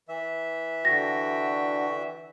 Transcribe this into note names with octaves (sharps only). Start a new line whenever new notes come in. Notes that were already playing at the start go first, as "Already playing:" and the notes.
E3 E5
D3 F#4 G5 A#6